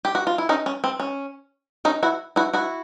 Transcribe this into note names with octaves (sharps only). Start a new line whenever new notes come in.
G4
F#4
F4
E4
C#4 D#4
C#4
C4
C#4
C#4 D#4
E4 F#4
E4 F#4
E4 F#4